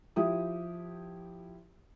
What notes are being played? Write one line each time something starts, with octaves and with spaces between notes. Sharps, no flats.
F3 E4 G4 D#6